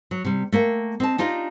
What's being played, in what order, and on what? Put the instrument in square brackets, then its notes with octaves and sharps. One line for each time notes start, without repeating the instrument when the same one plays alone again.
[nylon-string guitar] F#3
C3 G3
A3 A#3 F5 G5
C4 D#5 A5
D4 D#4 F4 G4 D#5